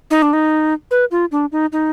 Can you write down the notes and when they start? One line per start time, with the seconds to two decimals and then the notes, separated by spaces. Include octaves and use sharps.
0.11 D#4
0.22 D4
0.33 D#4
0.91 B4
1.11 F4
1.32 D4
1.52 D#4
1.72 D#4